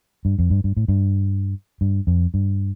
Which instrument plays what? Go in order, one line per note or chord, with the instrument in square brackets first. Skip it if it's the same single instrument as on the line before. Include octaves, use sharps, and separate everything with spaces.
[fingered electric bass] G2
F2
G2
G2
A2
G2
G2
F2
G2